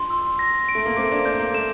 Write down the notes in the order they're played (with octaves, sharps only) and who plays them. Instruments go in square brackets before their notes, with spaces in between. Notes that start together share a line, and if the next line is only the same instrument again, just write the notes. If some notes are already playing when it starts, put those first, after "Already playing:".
Already playing: [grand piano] D4 F4 [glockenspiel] C6
[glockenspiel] E6
A#6
D7
[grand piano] A3
A#3
[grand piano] A3 C4 [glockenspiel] D6
[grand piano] A#3 D4
[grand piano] A#3 D4 [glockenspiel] G6
[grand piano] A#3
[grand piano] A3 [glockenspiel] E7